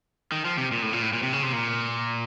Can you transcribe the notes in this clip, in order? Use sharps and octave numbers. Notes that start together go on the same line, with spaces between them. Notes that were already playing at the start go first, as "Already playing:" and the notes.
D#3
F3
C3
A#2
A2
A#2
A2
A#2
C3
C#3
C3
A#2